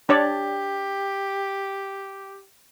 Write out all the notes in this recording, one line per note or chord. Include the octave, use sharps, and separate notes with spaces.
D4 G4 C#5 D5